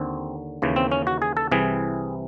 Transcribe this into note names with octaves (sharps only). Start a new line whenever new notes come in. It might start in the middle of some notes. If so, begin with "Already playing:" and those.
Already playing: D#2 D3 C4
D#2 C#3 E3
C4
C#4
F#4
G#4
A4
C2 C3 E3 G#4